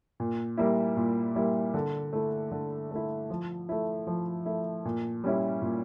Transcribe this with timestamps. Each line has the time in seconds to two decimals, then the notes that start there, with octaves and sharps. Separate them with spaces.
0.20 A#2
0.58 G3 A#3 E4
0.96 A#2
1.35 G3 A#3 E4
1.74 D3
2.13 A3 E4
2.51 D3
2.91 A3 E4
3.30 F3
3.69 A3 E4
4.07 F3
4.45 A3 E4
4.85 A#2
5.24 G3 C#4 E4
5.62 A#2